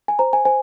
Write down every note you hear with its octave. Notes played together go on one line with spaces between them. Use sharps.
G#5
C5 A#5
G#5
C5 G#5